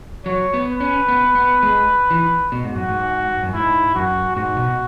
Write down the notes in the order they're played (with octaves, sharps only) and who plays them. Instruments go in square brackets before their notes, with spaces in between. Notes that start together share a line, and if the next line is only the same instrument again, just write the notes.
[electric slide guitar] F#3 [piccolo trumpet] C#5
[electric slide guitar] B3
[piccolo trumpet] B4
[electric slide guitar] C#4
B3
B3
G#3
E3
B2
G#2
[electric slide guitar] F#2 [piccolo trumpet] F#4
[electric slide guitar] G#2
F#2
[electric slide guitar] G#2 [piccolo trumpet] E4
[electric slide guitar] F#2 [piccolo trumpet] F#4
[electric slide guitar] G#2 [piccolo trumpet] F#4
[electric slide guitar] B2